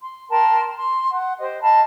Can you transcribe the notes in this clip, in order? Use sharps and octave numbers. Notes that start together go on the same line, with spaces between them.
C6
A#4 G5 A5 C6
C6
F#5
G4 C5 D#5
D#5 F5 A5 B5